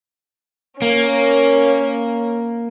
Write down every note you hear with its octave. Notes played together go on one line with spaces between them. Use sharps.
A#3 C#4